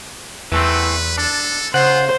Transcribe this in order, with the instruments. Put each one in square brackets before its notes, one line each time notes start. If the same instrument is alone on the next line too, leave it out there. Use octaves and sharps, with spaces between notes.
[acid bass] E2 [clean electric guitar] E3 A3 C4 [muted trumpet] B4
[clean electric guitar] D4 [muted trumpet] A4
[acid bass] C#3 [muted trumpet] F4 [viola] C5 [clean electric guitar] F#5